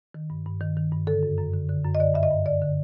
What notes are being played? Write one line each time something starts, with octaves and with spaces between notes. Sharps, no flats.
D#3
G2
G2
D#3
D#3
G2
D3 A4
F#2
F#2
D3
D3
F#2
D#5
D3 D5
G2 E5
D#5
G2
D3 D5
D3